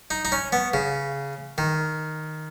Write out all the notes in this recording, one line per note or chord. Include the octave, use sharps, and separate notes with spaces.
D#4
D#4
C#4
B3
C#3
D#3